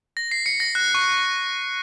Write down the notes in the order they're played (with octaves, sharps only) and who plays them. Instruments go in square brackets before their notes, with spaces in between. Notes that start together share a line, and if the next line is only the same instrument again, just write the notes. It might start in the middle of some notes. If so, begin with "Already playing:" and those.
[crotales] A#6
C7
C#7
A#6
F#6
C#6